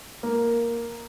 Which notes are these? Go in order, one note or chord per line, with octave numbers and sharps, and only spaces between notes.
A#3